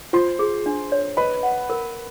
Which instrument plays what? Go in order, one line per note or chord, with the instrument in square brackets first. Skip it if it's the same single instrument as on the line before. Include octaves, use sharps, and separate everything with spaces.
[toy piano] F4 [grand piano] C5 C6
[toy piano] G#4
D4
C#5
[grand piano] B4 B5 [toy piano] D#5
[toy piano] F#5
A#4